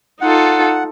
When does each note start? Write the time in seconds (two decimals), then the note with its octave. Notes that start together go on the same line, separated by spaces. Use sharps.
0.21 D#4 F4 A4 F#5